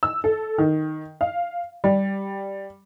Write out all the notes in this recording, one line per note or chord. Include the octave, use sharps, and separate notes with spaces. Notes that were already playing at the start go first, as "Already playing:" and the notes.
E6
A4
D#3
F5
G3